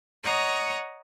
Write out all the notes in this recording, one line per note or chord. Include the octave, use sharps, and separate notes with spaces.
C#5 D#5 F#5 A#5 C#6 D#6